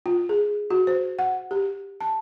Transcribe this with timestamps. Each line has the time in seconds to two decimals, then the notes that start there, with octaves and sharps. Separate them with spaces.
0.06 F4
0.29 G#4
0.70 F#4
0.87 C5
1.19 F#5
1.51 G4
2.01 A5